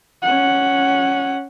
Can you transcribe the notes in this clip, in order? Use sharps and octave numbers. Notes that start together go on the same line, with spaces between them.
C#4 F#5